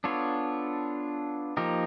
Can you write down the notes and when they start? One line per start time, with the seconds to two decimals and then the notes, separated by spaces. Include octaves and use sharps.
0.04 B3 D4 F4 A4 C#5
1.57 F3 A#3 D#4 G4 A#4